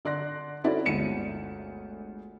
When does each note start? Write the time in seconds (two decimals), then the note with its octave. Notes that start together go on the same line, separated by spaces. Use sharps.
0.05 D3 D5 C6 F#6 A#6
0.64 C4 C#4 E4 F#4 A4 D5
0.86 G1 D2 G#3 C#7 D#7 E7